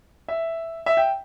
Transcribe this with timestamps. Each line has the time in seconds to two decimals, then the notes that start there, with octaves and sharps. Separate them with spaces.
0.28 E5
0.86 E5
0.97 G5